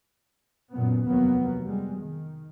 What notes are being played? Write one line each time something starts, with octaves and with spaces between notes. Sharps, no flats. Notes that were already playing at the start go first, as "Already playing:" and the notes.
F#2 A#2 B3
F1 D#2 F#3 A#3 B3
G3 G#3
D#3